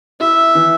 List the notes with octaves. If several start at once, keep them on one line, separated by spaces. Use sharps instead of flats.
E4 E5
E3